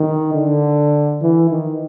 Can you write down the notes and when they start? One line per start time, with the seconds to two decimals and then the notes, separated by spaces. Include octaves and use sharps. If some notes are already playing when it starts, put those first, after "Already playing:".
Already playing: D#3
0.34 D3
1.22 E3
1.51 D#3